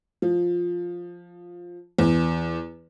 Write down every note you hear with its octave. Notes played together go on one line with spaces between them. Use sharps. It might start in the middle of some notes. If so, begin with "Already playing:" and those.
F3
E2